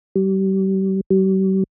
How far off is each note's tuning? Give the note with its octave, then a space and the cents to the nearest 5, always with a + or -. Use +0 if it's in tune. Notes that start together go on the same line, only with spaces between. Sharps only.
G3 -35
G3 -45